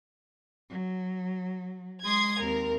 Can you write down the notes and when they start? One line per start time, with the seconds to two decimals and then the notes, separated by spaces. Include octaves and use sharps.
0.70 F#3
2.03 G#3 C6 D#6 G#6
2.40 D#2 C4 A#4